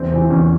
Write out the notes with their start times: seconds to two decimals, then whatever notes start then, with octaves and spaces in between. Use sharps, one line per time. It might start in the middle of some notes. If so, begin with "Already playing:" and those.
Already playing: E2 C4
0.11 C3 E3
0.30 E2 C#4